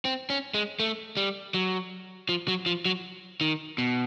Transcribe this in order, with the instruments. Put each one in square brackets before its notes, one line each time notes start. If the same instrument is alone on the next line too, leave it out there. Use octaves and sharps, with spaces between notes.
[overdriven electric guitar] C4
C#4
G#3
A3
G3
F#3
F3
F#3
F3
F#3
D#3
B2